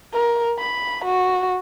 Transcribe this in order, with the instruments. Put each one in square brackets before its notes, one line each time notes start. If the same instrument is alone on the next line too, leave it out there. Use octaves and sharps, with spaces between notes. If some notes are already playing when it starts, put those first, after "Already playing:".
[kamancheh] A#4
B5
F#4